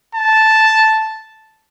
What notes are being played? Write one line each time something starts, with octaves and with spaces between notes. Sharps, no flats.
A5